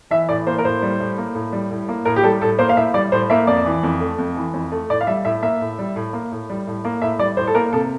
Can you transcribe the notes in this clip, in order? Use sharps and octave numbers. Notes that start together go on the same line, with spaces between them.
E3 E5
A2 D5
A#3 C5
A#4
A2 C5
G3
A2
A#3
A2
G3
A2
A#3
A2 A#4
G4
G3 A4
A2 A4
A#3 C5
F5
A2 E5
G3 D5
A2 C5
A#3 E5
F2 D5
E3
F2
A3
F2
E3
F2
A3
A2 D5
F5
G3 E5
A2 E5
A#3 E5
A2
G3
A2
A#3
A2
G3
A2
A#3
A2 E5
G3 D5
A2 C5
A4
A#3 A#4
C3 A4